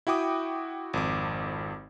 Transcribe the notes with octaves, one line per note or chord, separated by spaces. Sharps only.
E4 F#4 G5 D6 D#6
G#1 F2 D6